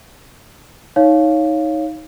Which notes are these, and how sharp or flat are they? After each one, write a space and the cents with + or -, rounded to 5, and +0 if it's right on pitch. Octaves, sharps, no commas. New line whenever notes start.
D#4 +20 C#5 +0 F5 +0